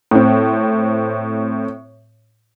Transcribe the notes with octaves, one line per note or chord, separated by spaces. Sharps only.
A2 C4